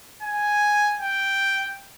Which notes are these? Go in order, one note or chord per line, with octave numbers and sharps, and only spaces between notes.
G#5
G5